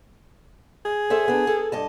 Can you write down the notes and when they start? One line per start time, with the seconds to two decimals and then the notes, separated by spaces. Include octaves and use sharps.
0.85 G#4
1.10 A4 C5 E5
1.28 B3 D4
1.47 A4
1.72 G2 D#5 A5